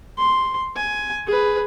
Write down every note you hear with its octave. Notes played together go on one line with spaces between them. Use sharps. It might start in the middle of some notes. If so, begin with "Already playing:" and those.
C6
G#5
G#4 B4